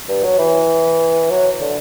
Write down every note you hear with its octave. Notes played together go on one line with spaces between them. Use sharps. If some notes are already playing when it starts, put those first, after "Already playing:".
G2
F#3
E3
F#3
D3